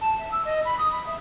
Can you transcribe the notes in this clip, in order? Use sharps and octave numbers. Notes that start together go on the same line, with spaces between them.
A5
E5
E6
D#5
B5
D#6
B5
E5